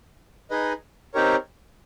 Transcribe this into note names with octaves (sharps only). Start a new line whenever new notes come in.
D#4 G#4 B4 D#5
C4 D#4 G4 A#4 C#5